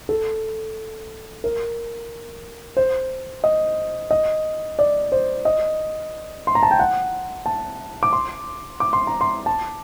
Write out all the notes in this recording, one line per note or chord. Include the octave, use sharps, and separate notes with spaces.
A4
A#4
C5
D#5
D#5
D5
C5
D#5
C6
A#5
A5
G5
F#5
A5
D6
C6
D6
C6
A#5
C6
A5